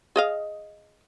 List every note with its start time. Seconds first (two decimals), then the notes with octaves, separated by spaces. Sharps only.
0.16 G#4 D#5 F5